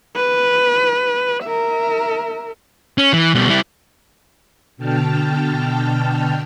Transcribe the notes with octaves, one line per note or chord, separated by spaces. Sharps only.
B4
A#4 E5
C#4
E3
B2 G3
G3 E4
B2 D3 G5 A5 F6